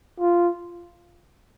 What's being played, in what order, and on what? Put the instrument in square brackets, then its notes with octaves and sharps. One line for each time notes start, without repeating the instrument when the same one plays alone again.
[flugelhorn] F4